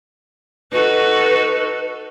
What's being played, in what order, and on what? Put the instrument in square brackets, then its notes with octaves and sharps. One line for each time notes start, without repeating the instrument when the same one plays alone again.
[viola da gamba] D#4 F#4 A4 [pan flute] B4